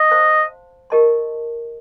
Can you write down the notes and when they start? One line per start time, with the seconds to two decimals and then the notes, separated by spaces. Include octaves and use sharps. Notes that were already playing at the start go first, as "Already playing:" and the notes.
Already playing: D#5
0.11 C5 F5 A5 C6
0.90 G4 A#4 D#5 A5 C6